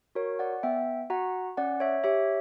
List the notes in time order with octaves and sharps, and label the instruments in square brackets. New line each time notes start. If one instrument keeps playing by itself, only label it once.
[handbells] F#4 A#4 C#5
D5 F#5
B3 E5 G5
F#4 F#5 A#5
C#4 D5 F#5
C#5 E5
G4 C#5 E5